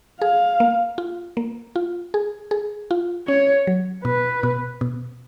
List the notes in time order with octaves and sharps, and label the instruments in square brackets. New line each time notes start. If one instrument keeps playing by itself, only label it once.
[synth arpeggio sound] G#4 [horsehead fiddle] F5
[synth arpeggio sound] A#3
F4
A#3
F4
G#4
G#4
F4
[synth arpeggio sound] C#4 [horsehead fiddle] C#5
[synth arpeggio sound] F#3
[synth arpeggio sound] B2 [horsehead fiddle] B4
[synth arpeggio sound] B2
B2